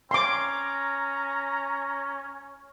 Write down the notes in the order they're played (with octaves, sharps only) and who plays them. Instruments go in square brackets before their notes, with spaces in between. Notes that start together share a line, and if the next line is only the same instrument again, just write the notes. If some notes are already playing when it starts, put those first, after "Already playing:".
[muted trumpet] C#4 [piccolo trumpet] A#5 [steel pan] C6 D6